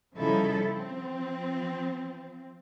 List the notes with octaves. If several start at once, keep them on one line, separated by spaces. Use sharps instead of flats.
C#3 F3 G3 D#4 E4 A4
F3 C4